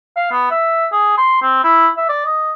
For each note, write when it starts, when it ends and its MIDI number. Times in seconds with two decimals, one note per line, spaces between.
0.17 0.28 77
0.32 0.48 59
0.51 0.87 76
0.92 1.15 68
1.17 1.39 84
1.42 1.62 60
1.64 1.88 64
1.97 2.04 76
2.09 2.24 74
2.26 2.52 75